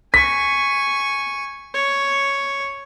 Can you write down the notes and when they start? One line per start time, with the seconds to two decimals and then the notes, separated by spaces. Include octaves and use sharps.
0.14 G#5 C#6 B6
1.74 C#5